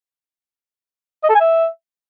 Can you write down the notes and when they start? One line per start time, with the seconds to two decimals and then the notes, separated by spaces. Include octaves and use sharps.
1.24 D#5
1.30 A4
1.35 G#5
1.41 E5